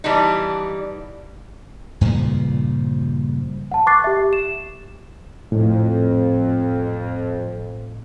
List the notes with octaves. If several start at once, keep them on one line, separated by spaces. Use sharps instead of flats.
E3 G3 B3 D4 D#4
G2 A#2 C#3 F3
F#5 A5
C#6 D6 F#6 A6 C7
G4 E5
E7
F2 A2